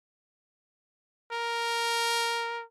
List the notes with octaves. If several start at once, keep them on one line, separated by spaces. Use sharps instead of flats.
A#4